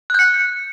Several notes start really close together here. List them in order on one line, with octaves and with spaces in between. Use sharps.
F#6 G6 C#7